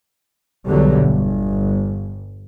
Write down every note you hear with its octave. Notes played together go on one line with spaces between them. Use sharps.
B1 E2 B2 D3 F#3 G3
G1